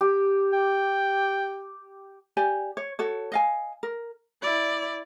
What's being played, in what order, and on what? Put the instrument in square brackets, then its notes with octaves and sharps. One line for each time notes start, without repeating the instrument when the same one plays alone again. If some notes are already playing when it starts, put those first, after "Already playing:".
[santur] G4
[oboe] G5
[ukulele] G4 D5 G#5
C#5
F#4 A4 C#5
D#5 F5 G#5
A#4
[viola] E4 D5